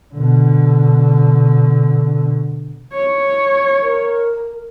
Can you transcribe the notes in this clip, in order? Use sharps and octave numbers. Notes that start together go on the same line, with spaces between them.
B2 D3
C#5
A#4